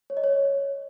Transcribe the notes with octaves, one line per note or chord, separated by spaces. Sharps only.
C#5
D#5
C#5